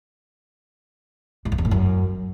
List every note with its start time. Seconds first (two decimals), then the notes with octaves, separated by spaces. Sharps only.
1.45 G#2
1.52 F2
1.58 E2
1.65 A2
1.71 F#2